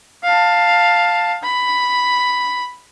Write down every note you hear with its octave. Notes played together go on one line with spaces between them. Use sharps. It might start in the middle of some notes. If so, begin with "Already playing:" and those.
F5 A5
B5